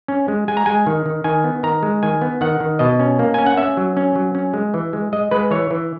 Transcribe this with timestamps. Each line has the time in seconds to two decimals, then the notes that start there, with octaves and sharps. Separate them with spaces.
0.08 C#4
0.28 G#3
0.48 G#3 G#5
0.57 A#5
0.66 G#3 G#5
0.86 D#3
1.06 D#3
1.24 D#3 G#5
1.44 B3
1.63 D#3 A#5
1.83 G#3
2.03 D#3 G#5
2.21 B3
2.41 D#3 F#5
2.60 D#3
2.79 B2 D#5
2.99 C#4
3.19 A#3
3.34 C#4 G#5
3.46 F#5
3.57 C#4 E5
3.77 F#3
3.97 C#4
4.15 F#3
4.35 C#4
4.54 G#3
4.74 E3
4.93 G#3
5.12 G#3 D#5
5.31 G#3 B4
5.51 E3 C#5
5.71 E3